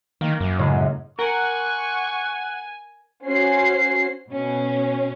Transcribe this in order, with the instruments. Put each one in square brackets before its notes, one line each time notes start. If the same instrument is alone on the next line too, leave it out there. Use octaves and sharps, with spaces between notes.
[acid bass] D#3 [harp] A#3
[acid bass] F#2
[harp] A2 C#3 G#3
[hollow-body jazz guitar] A#4 [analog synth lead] F#5 [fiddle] G#5 [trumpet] C#6
[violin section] C#4 F#4 C5 C7
[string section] B2 C#4